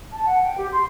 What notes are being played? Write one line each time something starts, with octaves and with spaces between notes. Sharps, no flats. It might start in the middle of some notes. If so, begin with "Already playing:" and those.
A5
F#5
G5
G4
C6